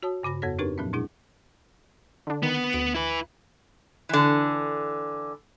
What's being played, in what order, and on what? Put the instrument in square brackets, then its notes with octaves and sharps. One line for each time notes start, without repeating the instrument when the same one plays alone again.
[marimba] F#4 C#5 A5 D#6
G2 C#3 B5 A#6
F2 B3 F#4 A4 C#5 A#6
C4 D4 D#4 G4 A#4 B4
A#2 F3 F#3 B3 C#4
B2 G#3 D4 E4 G#4
[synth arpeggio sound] D3 D4
[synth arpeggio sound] D#3 [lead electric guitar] B3
[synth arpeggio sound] D2 D7
[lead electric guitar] E4 B4
[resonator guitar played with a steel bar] D3 E3